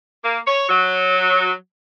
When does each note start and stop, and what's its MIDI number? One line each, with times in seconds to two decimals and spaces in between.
0.22 0.37 58
0.45 0.66 73
0.68 1.50 54